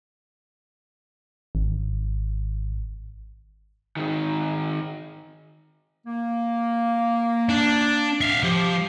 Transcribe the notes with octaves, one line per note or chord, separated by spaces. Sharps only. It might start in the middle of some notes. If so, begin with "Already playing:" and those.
G#1
G#2 D#3
A#3
D4
E5 F5
F3 G4